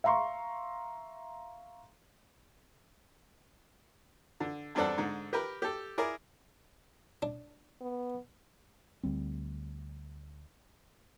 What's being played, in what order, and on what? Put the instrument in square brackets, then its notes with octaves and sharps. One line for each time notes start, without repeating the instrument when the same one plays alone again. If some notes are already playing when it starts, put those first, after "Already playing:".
[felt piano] E5 F5 A#5 C6 C#6
[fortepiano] D3
E2 G2 C4 D4 A4 F#5
G#2 D3
G4 A#4 B4
G4 A4
E4 G#4 A#4 D5
[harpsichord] D4
[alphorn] B3
[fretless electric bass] D2 G3 C4